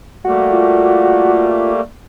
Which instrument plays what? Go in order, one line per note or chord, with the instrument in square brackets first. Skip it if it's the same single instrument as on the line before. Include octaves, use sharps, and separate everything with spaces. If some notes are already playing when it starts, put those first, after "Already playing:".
[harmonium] G3 A3 A#3 [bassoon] F#4
[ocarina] F4